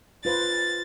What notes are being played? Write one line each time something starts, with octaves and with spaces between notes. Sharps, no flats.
F4 B4 C5 A6